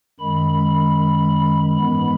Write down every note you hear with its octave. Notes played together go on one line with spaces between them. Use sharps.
F#2 D#3 G#3 B5
G#2 E3 G#3 B3 B5